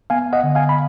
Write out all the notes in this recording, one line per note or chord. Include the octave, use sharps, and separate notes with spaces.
B3 F5 G#5
D#5 F#5
D3
F5 G#5
B5